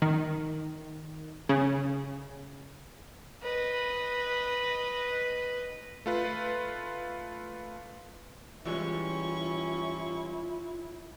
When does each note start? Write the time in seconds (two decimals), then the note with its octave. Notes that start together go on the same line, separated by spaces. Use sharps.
0.02 D#3
1.49 C#3
3.43 B4 D#5
6.06 A3 F4 B4
8.65 E3 G3 G#3 C#4 E4 F4 C#6